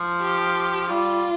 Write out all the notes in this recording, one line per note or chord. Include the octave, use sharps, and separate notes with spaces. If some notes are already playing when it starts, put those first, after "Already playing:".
Already playing: F3
G4
G3 F4